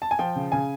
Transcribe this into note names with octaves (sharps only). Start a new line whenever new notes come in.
A5
G#5
F3 G5
C#3
C#3 G#5